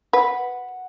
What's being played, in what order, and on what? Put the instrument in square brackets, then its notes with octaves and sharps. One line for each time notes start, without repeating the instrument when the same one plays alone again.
[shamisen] B4 [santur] F#5